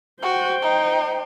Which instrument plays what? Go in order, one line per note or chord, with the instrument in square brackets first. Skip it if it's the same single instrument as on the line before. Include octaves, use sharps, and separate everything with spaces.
[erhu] F#4 [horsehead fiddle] C5 G5
[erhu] D#4